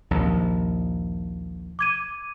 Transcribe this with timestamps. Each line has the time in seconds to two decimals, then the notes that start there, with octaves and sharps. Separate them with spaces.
0.11 A#1 D#2
1.79 D6 G#6 D#7